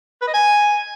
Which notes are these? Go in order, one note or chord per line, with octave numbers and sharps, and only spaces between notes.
B4
D#5
G#5